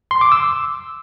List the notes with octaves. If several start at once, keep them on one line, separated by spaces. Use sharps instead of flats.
C6
D6
E6